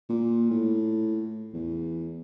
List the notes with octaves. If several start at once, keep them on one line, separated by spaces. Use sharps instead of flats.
A#2
A2
E2